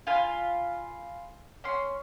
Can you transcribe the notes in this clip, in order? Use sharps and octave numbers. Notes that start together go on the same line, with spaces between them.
F4 F5 G#5 B5
C#4 C6